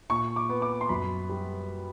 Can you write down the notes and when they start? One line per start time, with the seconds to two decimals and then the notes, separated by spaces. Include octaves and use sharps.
0.09 A#2 C#6
0.36 D6
0.49 B3
0.62 D6
0.81 C6
0.89 F#2 B5
1.29 G3